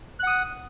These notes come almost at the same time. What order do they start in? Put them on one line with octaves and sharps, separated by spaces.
F#6 F#5 D#6